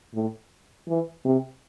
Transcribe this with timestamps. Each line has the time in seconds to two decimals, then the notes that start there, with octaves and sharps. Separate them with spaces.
0.14 A2
0.88 E3
1.25 C3